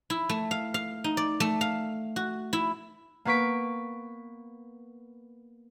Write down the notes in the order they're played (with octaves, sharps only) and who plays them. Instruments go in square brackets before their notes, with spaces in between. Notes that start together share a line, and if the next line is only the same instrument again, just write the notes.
[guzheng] E4
A3
F5
F5
D#4
D5
A3
F5
F#4
E4
[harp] A#3 B3 B4 C#6 B6 D7